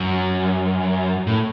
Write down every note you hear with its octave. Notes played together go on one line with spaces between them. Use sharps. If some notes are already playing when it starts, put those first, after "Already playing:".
Already playing: F#2
A2